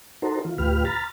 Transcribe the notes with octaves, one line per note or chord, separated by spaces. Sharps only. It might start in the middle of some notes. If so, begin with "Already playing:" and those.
D#4 F#4 A4 A#4 C5
E3 F4
D2 A2 F4 G4 B4 F6
A#5 B5 F6 A6